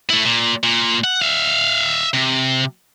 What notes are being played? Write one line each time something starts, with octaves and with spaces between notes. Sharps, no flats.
A3 E4
A#2
A#2
F#5
E5 F5
C3